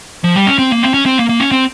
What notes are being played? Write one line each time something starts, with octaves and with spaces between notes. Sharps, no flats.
F3
G3
C#4
C4
A#3
C4
C#4
C4
A#3
A#3
C#4
C4